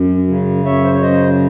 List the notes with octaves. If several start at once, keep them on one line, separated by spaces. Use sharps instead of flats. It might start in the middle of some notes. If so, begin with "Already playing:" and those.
Already playing: F#2
C#3
F#2 C#5 E5
C5
C#5
C#3 C5 D#5